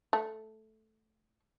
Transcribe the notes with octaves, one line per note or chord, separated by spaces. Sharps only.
A3